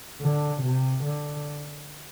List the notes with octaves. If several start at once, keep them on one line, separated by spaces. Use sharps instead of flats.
D3
C3
D3